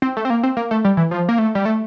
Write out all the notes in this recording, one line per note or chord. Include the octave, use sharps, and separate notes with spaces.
C4
A3
C4
A#3
C4
A#3
A3
G3
E3
F3
A#3
A3
G3
A3